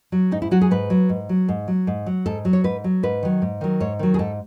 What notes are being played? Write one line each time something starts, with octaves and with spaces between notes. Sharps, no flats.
F#3
G#2 D#4
E4
F#3 F#4
G#4
G#2 B4
F#3
G#2
F#3
G#2
F#3
G#2
F#3
G#2 A4
F#3
C#5
G#2 B4
F#3
G#2 B4
D#3 F#3
G#2
D#3 F#3
G#2 C#5
D#3 F#3
G#4
G#2 A4